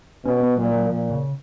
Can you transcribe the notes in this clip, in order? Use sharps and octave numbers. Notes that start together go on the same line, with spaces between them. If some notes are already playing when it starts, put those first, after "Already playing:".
B2 C#4
B3
A#2 F#3
F#3
A#2 F3
C#3